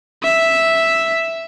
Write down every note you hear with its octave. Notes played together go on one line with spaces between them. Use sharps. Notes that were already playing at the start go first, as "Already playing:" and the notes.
E5